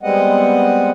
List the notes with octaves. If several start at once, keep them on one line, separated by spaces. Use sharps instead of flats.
G3 G#3 B3 C4 D#5 F#5